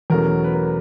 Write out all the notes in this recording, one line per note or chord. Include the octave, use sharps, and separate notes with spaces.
E2 B2 F#3 A3 C#4 A#4
B4
A#4